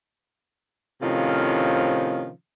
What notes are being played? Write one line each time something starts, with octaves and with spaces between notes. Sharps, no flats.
A2 C3 D#3 F3 C#4 F4